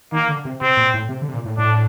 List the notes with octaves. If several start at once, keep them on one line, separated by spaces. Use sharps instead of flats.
D#3 A#3
D3
C3
C3 C4
A#2
A2
C3
D3
C3
A#2
A2
A2 D4